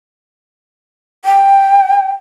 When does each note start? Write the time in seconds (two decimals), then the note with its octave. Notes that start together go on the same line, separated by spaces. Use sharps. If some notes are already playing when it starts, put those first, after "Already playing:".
1.25 G5